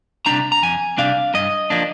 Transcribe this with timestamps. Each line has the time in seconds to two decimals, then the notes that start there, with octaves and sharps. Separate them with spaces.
0.26 C3 G3 D4 A#5
0.52 A#5
0.62 F2 G#5
0.98 C3 G3 D4 F5
1.34 G2 D#5
1.70 F3 A#3 D4